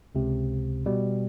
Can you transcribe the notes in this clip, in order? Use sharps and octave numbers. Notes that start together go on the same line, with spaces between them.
C#2 C3
B2 G3